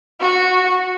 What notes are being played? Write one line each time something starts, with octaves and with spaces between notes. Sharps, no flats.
F#4